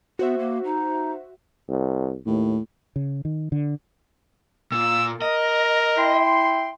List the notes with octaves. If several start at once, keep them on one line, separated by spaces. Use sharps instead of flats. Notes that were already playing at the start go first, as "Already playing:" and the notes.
B3 F#4 C5 E5
A#3
D#4
C2
D#2 A2
C#3
D#3
D3
A#2 E6
A#4 D#5
E4 G5 C6